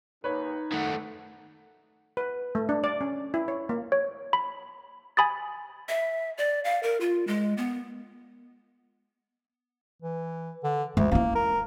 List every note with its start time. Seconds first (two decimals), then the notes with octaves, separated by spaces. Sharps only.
0.24 D#2 D#4 B4 C#5
0.72 D#3 A3 A4 F#5
2.17 B4
2.55 A3
2.69 D4
2.84 D5
3.01 C#4
3.34 E4
3.48 C#5
3.69 A#3
3.92 C#5
4.33 B5
5.17 G#5 B5 D#6 A6
5.89 E5
6.38 D5
6.65 F5
6.83 A#4
7.01 F4
7.27 G#3
7.57 B3
10.02 E3
10.64 D3
10.97 D2 G#3
11.12 A#3 C#4 E4
11.35 A#4